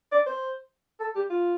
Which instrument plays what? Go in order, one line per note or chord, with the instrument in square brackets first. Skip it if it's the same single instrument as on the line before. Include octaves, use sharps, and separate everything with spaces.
[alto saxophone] D5
C5
A4
G4
F4